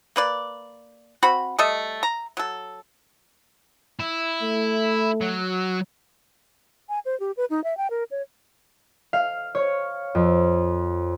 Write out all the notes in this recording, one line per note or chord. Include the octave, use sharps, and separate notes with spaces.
A#3 B4 D5
C4 F#4 B5
G3 A3 A4 D#5
A#5
F#3 A4
E4
A3
F#3
G#5
C5
G4
B4
D#4
E5
G5
A#4
C#5
F5
C#5
F2